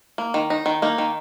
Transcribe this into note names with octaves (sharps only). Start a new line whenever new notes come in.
A#3
D#3
D#4
D#3
A#3 D#4
D#3